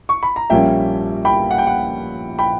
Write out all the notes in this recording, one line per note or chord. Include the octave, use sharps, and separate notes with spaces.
C#6
B5
A#5
A#1 A#2 G3 A#3 C#4 E5 G5
G5 B5
F#5
G5
F#5
G5 B5